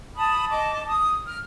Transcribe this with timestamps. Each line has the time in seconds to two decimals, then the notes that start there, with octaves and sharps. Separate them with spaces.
0.16 A5 B5 D#6
0.51 D#5 A5 D6
0.89 D#6
1.27 F6